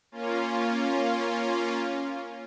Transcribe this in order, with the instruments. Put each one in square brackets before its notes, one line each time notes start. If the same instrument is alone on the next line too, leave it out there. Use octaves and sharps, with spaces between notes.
[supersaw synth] A#3 C#4 F4